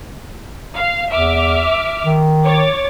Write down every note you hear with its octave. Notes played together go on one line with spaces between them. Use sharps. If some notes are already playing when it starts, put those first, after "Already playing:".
F5
E2 E5 D6 F6
D#3
C#5 D6 A6